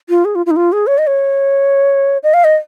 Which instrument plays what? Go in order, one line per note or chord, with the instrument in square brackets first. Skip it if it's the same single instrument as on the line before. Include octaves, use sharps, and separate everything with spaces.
[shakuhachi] F4
G#4
F4
F4
D#4
F4
G#4
C#5
D#5
C#5
D#5
F5
D#5